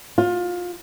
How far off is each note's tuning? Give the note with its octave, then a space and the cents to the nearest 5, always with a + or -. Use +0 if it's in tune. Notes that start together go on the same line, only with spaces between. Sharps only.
F4 +25